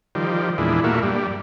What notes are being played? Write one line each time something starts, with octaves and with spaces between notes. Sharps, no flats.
D#3 F3 G3
E2 A#2 G#3 D4 E4
A#2 A3 A#3 F#4 E5
G2 G3